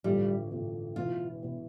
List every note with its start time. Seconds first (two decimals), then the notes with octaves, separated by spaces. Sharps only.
0.04 A1 G2 D3 F3 G3
0.51 A1 G2 D3 F3
0.96 E1 E2 E3 F4
1.43 E1 E2 E3